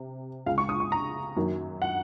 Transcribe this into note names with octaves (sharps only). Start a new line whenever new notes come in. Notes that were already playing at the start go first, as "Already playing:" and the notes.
Already playing: C3
C#2 C#3 G#3 F5
C#6
D#6
C#6
A#5
F#2 D#3 F#3 A#3
F#5